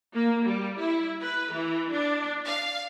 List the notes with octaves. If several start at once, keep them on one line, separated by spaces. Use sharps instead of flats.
A#3
G3
E4
B4
E3
D4
F5